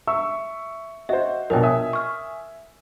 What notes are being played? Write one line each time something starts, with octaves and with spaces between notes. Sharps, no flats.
E5 C#6 E6
F#4 C5 D#5 E5
A#1 B2 A#4 C#5 G5
E5 G#5 D#6
C#6 F6